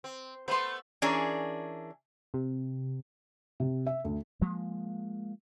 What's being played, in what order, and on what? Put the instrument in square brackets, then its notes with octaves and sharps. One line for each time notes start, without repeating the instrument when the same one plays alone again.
[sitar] C4
[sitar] A3 B3 C5 [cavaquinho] B4 C6
[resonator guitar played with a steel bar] E3 C#4 D4 G#4 A#4
[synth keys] C3
[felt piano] C3
E5
D2
[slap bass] F3 G#3 A#3